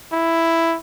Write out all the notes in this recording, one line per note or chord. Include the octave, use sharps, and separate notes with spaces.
E4